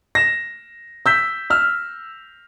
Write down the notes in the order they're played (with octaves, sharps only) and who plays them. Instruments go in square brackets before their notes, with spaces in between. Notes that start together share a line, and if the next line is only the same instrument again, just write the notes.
[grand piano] A#6 E7
E6 G6 B6
E6 F6